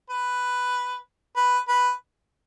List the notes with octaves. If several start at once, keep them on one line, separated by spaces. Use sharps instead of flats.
B4
B4
B4